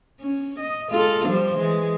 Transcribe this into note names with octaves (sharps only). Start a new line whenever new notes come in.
C#4
D#5
G#3 F4 A4
F3 G3 C5
E3 G#3